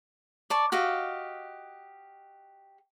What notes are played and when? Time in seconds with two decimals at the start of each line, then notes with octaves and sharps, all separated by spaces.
0.50 D5 A5 C#6
0.72 F#4 G4 D#5 F5